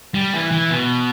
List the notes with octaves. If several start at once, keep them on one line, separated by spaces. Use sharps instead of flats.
G3
E3
E3
B2